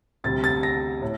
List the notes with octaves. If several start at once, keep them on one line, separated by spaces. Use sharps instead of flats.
D2 C3 G3 A6
A6
A#6
A2